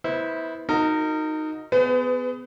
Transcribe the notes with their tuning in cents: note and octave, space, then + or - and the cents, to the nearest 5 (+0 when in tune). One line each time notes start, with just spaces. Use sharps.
B3 +0 E4 -25 C5 +0
D#4 +0 F#4 -25 A#4 -30
B3 +25 G#4 +0 B4 +45